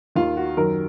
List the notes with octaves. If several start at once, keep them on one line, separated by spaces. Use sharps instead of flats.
D#2 D#3 F4
F#4
F#2 D#3 A#4